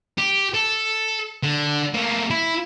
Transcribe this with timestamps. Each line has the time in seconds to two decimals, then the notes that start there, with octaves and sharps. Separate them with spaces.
0.18 G4
0.54 A4
1.43 D3
1.94 A3 A#3
2.30 E4